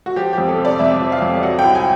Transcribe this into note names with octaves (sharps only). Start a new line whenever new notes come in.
F#4
F3 G4
F2 G4
A4
C3
D5
F2 E5
F3
F5
F2
F#3 F#5
C2 G5
G#5